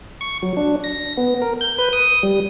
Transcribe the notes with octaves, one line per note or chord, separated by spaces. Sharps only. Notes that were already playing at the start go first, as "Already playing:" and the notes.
C#6
F#3
D4
A#6
B3
A#4
G6
B4
D#6
G3